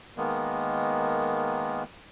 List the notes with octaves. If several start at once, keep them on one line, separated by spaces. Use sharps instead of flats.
D#3 G#3 A#3 B3